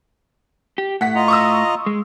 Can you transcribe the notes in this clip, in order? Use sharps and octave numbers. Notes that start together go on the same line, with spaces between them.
G4
A2 F#5 B6
F4 D#5 A#5
C#6 D#6 E6
G#3